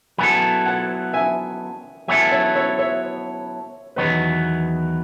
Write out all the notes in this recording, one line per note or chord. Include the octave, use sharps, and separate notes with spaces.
F#3 B3 E4 A4 G#5 B5
F#5 A5
E5 G#5
F#3 B3 E4 A4 E5 G#5
C#5 E5
C#5 E5
C#5 E5
E2 D#3 F#3 B3 B4 D#5